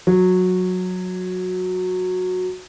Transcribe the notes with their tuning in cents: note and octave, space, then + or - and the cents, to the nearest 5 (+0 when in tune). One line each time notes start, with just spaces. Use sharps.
F#3 -15